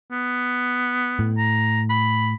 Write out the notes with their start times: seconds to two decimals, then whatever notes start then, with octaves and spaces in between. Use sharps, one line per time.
0.12 B3
1.19 A2
1.38 A#5
1.90 B5